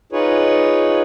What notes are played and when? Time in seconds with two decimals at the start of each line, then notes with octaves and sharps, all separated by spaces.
0.12 D#4 F4 G#4 B4 C#5